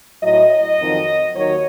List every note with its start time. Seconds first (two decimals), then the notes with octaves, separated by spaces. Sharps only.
0.21 A2 F#3 D#5
0.49 D#5
0.78 F2 D#3 F#3
1.34 D#2 D#3 F#3 C#5